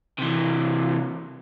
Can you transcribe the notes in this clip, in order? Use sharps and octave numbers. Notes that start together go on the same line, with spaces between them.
C3 E3